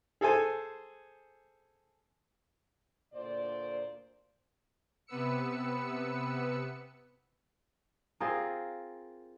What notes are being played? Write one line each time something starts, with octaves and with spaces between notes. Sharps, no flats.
G#4 A4 C5 G#5
D2 A#2 C5 D5
C3 B3 B4 E6 C#7
C4 F4 G#4 A#4